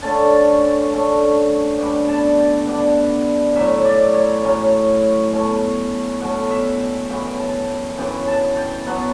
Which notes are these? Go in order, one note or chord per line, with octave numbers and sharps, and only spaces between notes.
D3 A3 C#4 A5
D3 A3 C#4
B2 G3 B3 D4 G5
A5
G5
B2 G3 B3 D4 F#5
A2 F#3 C#4 E5
D5
C#5
A2 F#3 C#4
B2 A3 C#4
B2 A3 C#4 F#5
E5
G5
F#2 C#3 E3 B3 G5
A5
G5
F#2 C#3 E3 B3 G5
A5
G5
B2 F#3 B3 F#5